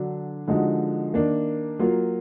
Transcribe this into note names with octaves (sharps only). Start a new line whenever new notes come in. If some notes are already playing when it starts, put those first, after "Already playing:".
Already playing: D3 F#3 D4
D3 F3 G#3 D#4 F#4
D#3 A#3 D4
F#3 A#3 F4